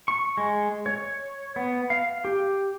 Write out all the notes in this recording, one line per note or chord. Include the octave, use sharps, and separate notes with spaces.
C#6
G#3
C#5
B3
F5
G4